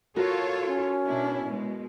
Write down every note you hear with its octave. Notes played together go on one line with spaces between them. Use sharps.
F4 F#4 A4 A#4 C#5
C#4
B2 D4 E4
B2 G#3